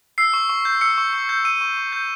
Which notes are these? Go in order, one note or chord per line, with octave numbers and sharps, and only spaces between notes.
E6 C7
C#6
C#6
G6
E6 C#7
C#6
C#6
G6
E6 D#7
C#6
C#6
G6